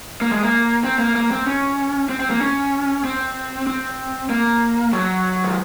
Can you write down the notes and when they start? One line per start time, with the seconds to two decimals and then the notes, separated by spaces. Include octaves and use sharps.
0.21 A#3
0.31 G#3
0.43 A#3
0.84 C4
0.99 A#3
1.16 A#3
1.31 C4
1.47 C#4
2.09 C4
2.20 C4
2.30 A#3
2.41 C#4
3.04 C4
3.67 C4
4.30 A#3
4.93 F#3
5.44 D#3